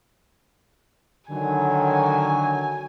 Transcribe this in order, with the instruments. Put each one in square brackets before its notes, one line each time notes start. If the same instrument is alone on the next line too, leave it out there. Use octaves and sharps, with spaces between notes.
[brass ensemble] D3 D#3 F#3 [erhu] G#5